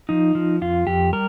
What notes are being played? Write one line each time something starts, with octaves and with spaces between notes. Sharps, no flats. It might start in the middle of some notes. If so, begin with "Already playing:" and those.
F3 D#4
F3
F2 F4
F2 G4
G3 A#4